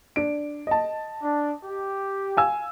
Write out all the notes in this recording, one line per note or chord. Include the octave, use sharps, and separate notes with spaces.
D4 D7
D#5 A5
D4
G4
F5 G#5 E6